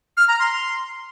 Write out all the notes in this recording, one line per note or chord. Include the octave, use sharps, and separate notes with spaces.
F6
A#5
C6